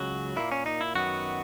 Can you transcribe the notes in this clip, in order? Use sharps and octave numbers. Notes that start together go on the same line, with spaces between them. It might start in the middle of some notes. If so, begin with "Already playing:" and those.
Already playing: C#2 C#3 F#3 F#4
A#2 A#3 E4
C#4
D#4
E4
F#2 D#3 F#3 B3 F#4